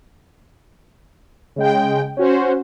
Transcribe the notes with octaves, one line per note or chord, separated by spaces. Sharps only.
C#3 G#3 G5
C#4 F#4 C5